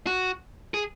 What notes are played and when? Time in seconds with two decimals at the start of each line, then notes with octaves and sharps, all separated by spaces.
0.07 F#4
0.74 G#4